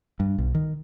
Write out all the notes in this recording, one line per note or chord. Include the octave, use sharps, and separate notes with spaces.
G2
B1
D#3